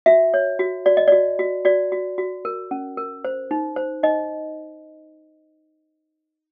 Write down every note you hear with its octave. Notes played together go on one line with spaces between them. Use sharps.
F#4 E5
C#5
F#4
F#4 D5
D#5
F#4 D5
F#4
F#4 D5
F#4
F#4
A#4
C#4
A#4
C5
D#4
C5
D#4 D#5